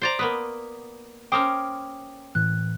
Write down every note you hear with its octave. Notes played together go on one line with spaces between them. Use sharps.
C5 D5 A#5
A#3 B3 B4 D#6
C#4 A#4 C5 G5 D6 D#6
A2 E3 F#6